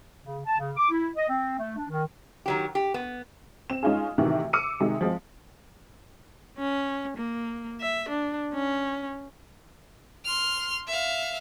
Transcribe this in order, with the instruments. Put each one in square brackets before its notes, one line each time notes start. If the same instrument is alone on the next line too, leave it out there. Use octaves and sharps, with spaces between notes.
[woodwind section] C#3
A5
C#3
D6
E4
D#5
C4
A3
D4
D#3
[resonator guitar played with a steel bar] D#3 F#3 G4
G4
B3
[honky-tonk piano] C4 E7
G#3 C#4 D#4 F4 G#4
A2 C3 D#3 E3 F#4
D6 E6 C#7 D#7
C3 D#3 G#3
F3 G#3 C4
[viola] C#4
A#3
E5
D4
C#4
[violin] C6 F6
E5 F5